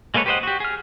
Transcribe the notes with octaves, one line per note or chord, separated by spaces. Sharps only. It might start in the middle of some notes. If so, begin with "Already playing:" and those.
G#3 A#3 A4 B4 C#5
G4 B4 C5 D#5 F#5
F#4 G4
G#4 F6